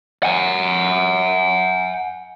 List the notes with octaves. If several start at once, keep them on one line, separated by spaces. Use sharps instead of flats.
F#5 G#5